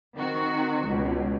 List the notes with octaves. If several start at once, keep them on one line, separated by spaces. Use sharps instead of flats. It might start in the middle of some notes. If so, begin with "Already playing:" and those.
D#3 C4 F#4
C#2 B2